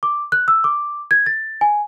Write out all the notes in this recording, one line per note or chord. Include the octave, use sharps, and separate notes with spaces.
D6
F#6
E6
D6
G#6
A6
G#5